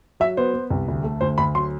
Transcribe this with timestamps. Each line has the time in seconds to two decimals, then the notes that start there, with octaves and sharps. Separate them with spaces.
0.20 F#3 E5
0.37 B3 C5
0.54 B3
0.70 C2
0.88 D2
1.04 A3
1.21 D2 C5
1.38 D2 B5
1.55 F#3 C6